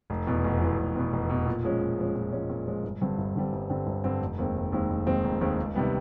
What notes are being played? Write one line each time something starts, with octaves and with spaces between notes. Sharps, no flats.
F1
E2 B2
F1
E2 B2
F1
E2 B2
F1
E2 B2
A#2
F3 G#3 C#4
A#2
F3 G#3 C#4
A#2
F3 G#3 C#4
A#2
F3 G#3 C#4
G1
G2 D3 G3 C4
G1
G2 D3 G3 C4
G1
G2 D3 G3 C4
G1
G2 D3 G3 C4
F1
D#2 D#3 G#3 C4
F1
D#2 D#3 G#3 C4
F1
D#2 D#3 G#3 C4
F1
D#2 D#3 G#3 C4
C#2
C3 D#3 G3 B3